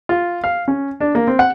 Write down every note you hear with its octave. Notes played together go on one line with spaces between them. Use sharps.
F4
F5
C#4
D4
A#3
C4
F#5